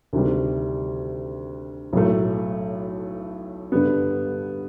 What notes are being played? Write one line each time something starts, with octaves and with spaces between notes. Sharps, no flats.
D2 C3 D#3 G3
B1 A2 F#3 A3
G2 D3 G3 B3